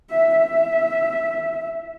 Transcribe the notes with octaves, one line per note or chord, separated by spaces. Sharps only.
E5
E5